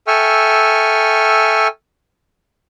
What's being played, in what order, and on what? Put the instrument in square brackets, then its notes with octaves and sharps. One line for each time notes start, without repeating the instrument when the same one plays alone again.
[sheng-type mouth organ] A4 E5 G5 G#5 C#6 F6